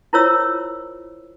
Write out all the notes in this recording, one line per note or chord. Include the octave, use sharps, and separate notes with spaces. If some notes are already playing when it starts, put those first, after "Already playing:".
E4 F4 A#4 C5 C#5 E6